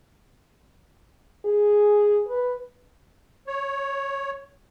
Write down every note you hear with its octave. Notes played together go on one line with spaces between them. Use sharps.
G#4
B4
C#5